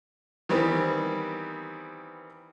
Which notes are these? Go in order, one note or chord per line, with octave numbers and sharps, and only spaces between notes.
D#3 E3 G3 B3 C4